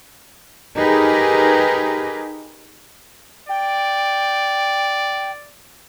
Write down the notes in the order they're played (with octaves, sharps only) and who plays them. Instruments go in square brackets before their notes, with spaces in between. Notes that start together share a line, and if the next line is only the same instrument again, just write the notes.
[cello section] D#4 G4 G#4 A#4 B4
[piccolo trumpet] D5 [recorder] G5